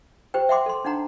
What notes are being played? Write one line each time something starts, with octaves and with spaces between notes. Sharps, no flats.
G4 C5 G5
E5 F#5 G5 C6 D6
A4 C6
D4 D#4 F#5 A#5